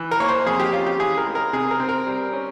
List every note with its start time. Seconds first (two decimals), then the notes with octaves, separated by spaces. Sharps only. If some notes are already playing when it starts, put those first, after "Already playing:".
Already playing: E3
0.11 A#4
0.20 A#3 C#5
0.29 C5
0.46 F2 G#4
0.60 G4
0.73 C#4 F4
0.86 G4
1.00 E3 G#4
1.17 A#4
1.27 G#3
1.35 A#4
1.53 C3 G#4
1.71 A#4
1.80 C4
1.89 A#4
2.07 G3
2.33 C#4